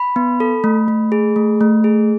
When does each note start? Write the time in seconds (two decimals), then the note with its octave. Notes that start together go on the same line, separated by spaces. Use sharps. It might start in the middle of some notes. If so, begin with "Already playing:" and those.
Already playing: B5
0.16 B3
0.40 A4
0.64 A3
0.88 A3
1.12 G#4
1.36 A3
1.61 A3
1.84 G#4